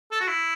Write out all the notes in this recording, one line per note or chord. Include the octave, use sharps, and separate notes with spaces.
A4
F#4
E4